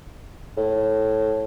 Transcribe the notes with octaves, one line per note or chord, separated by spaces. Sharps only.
A2